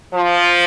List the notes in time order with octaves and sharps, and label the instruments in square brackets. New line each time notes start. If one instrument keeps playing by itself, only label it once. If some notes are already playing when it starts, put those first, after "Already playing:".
[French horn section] F3